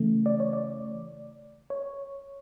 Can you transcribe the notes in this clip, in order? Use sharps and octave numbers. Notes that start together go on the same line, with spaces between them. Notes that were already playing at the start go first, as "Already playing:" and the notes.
Already playing: C#3 E3 A3
D5
C#5
D5
C#5